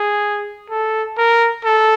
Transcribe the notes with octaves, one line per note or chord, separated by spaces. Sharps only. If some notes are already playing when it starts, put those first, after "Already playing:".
Already playing: G#4
A4
A#4
A4